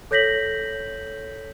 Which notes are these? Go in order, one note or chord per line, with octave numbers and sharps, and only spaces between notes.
A4 C#5 G6 A#6 B6 F#7